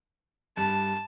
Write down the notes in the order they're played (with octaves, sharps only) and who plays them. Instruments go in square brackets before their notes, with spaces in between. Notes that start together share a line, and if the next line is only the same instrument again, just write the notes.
[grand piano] G2 [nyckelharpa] A5